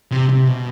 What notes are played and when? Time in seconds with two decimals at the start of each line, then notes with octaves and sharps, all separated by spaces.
0.11 C3
0.29 C3
0.47 B2